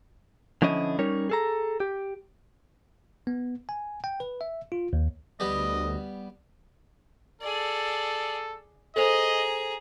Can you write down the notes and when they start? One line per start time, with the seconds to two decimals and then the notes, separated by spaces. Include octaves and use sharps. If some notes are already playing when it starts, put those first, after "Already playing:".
0.62 D3 F3 C#4 E4 D#5
0.99 G3 C#4 D#4 A#4 C#5
1.30 G#4 A4 A#5
1.80 G4
3.27 B3
3.69 G#5
4.04 G5
4.20 B4
4.41 E5
4.72 F4
4.93 D#2
5.40 D2 G3 B3 D#5
7.41 G#4 A4 D5
8.96 G#4 A4 C5 D#5 A#5 F7